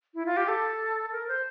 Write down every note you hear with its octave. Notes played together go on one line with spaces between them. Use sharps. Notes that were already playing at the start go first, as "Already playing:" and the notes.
E4
F4
G4
A4
A#4
C5